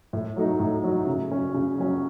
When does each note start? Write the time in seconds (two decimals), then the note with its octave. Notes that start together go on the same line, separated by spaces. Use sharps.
0.13 A2
0.36 F#3 A3 D#4
0.60 A2
0.83 F#3 A3 D#4
1.07 C#3
1.31 F#3 C#4
1.54 C#3
1.78 F#3 C#4